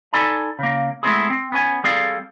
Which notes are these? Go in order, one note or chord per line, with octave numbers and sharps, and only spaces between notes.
D#4 A4 D5 G#5 A5 B5
C#3 A#3
G#3 A3 B3 C4 E4 G#4
C4
B3 C#4 G#5
G3 C4 G#4 A4 D5 F5